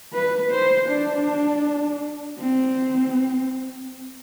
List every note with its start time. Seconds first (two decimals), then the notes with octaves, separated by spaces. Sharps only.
0.14 B4
0.52 C5
0.89 D4
2.39 C4